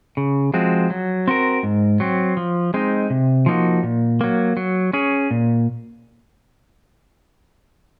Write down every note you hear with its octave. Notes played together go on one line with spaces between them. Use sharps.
C#3
F3 G#3 C4 F#4
F#3
C4 F#4 A#4
G#2
F#3 C4
F3
G#3 C4 D#4
C3
F3 A#3 D#4 F#4
A#2
F#3 A#3
F#3
C#4 G#4
A#2